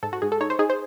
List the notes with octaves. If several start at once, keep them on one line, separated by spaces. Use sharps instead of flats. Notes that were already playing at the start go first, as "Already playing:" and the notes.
G#2 A4
F#4
G#2 G#4
A4
D#4 C#5
C5
D#4 G#4
C5